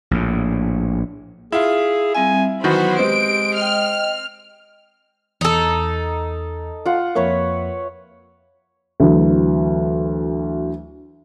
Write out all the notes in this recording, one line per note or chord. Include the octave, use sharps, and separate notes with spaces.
A#1 A2
E4 F4 G#4
G3 C4 E5 G#5
D#3 E3 F#3 B3 F#4 C5 B5
G#3 C4 G4 D7
D#5 G5 F6
E2 D#4 A4
F4 F#5
F2 A#3 B4 C#5 E5
D2 E3 F#3